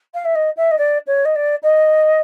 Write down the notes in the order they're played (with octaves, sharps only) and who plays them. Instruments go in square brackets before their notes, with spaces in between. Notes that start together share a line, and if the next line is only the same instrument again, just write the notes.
[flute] F5
E5
D#5
E5
D#5
D5
C#5
D#5
D5
D#5